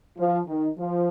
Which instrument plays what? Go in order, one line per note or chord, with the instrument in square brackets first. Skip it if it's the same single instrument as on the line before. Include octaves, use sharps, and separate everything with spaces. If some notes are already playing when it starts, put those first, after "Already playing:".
[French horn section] F3
D#3
F3